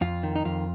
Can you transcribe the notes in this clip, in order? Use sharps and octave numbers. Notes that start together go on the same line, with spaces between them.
F2 F4
D#3
D#4
F2 F4